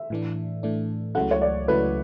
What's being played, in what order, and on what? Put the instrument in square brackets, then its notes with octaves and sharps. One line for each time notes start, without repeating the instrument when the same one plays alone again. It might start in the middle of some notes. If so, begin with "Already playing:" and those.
Already playing: [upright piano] E5
[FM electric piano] A2 E3 A3 D4
A2 E3 A3 D4
[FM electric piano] C#2 C#3 F#3 A3 E4 [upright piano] F#5
[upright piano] C#5
D5
[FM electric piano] C#2 C#3 F#3 A3 E4 [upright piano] B4